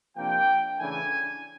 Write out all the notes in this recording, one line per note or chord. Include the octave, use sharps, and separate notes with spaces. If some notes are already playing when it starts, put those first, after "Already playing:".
C3 F3 A#3 D4 G5
C#3 E3 A3 D4 G#5